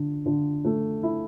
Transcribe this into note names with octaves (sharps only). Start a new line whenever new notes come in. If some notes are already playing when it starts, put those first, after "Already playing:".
Already playing: D3
D3
A3
E4